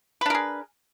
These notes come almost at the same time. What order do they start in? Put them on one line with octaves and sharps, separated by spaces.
B4 D4 A#4 G#4